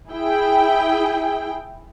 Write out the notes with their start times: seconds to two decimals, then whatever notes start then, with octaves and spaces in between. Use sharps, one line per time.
0.10 E4 G#4 G5